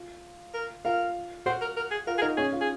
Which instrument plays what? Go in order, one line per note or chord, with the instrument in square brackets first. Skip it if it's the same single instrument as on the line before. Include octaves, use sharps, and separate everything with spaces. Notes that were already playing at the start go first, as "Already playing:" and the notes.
Already playing: [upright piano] F4
[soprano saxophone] A#4
[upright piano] F4 F5 [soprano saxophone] A#4
[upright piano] F#4 F#5 [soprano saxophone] C5
[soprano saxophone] A#4
A#4
G#4
[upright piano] F4 F5 [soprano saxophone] A#4
[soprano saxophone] G#4
[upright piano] D#4 D#5 [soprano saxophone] A#4
[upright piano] C#4 C#5 [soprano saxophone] G#4
[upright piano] F4 F5
[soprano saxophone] G#4